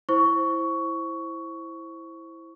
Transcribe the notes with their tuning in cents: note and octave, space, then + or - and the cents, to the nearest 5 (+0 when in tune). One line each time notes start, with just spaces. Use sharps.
E4 +0 C5 +10 C#6 +15